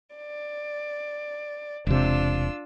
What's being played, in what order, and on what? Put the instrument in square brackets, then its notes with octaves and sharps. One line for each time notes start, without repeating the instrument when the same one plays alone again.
[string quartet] D5
[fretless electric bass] E1 C3 [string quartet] D4 F4 E6